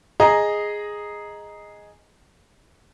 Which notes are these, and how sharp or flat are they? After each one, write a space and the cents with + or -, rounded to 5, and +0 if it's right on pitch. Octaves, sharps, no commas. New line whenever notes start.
G#4 +0 D#5 +0 A#5 +5